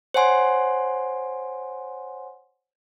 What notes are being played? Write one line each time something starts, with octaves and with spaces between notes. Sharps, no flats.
C5 C#5 F#5 G#5 C6